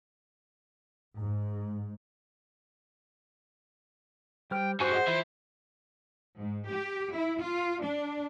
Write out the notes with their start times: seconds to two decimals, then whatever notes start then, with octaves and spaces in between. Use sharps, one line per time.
1.17 G#2
4.51 G3 C5 G5 F6
4.80 G2 F#3 C5 G#5 C#6 D#6
4.91 G#4 D#5 F#5
5.07 E3 E4 F4 C6
6.38 G#2
6.69 G4
7.12 E4
7.41 F4
7.82 D4